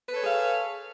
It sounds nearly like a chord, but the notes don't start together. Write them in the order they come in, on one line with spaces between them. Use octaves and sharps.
B4 A4 C#5 G#4 F5